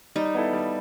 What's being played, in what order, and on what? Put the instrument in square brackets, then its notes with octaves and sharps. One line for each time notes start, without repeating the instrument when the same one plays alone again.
[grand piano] G3 [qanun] D#4
[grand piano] B3 E4 A4
G3